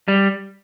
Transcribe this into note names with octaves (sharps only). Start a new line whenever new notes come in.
G3